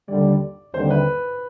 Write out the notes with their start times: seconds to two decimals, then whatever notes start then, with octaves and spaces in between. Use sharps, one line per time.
0.08 D#2 D3 G3 D5
0.73 D#2 D3 G3 C4 C5
0.90 B4